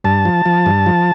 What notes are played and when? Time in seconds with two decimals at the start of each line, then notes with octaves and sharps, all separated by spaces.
0.04 G2 A5
0.25 F3
0.46 F3
0.66 G2
0.86 F3